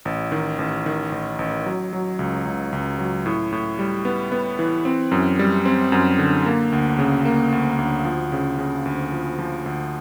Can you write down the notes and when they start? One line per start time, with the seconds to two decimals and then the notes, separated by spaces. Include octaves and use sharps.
0.05 A1
0.32 D#3
0.59 A1
0.86 D#3
1.12 A1
1.39 A1
1.66 F#3
1.93 F#3
2.19 C#2
2.45 C#2
2.72 C#2
2.99 F#3
3.26 A2
3.52 A2
3.79 G3
4.05 B3
4.32 B3
4.59 E3
4.85 C4
5.11 F#2
5.39 G3
5.66 C4
5.92 F#2
6.19 D3
6.46 A#3
6.72 D2
6.99 C#3
7.25 A#3
7.52 D2
7.78 D2
8.05 F3
8.32 C#3
8.58 C#3
8.86 D2
9.12 F3
9.39 F3
9.66 D2